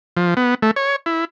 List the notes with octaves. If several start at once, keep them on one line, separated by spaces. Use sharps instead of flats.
F3
B3
A3
C#5
E4